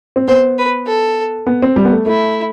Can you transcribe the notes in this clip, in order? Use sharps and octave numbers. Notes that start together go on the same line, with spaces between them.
C4
B3 C5
B4
A4
B3
C4
G3
B3
A3
A3 E4